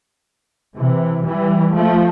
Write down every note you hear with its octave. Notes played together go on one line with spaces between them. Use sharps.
C3 E3
E3 G3
F3 A3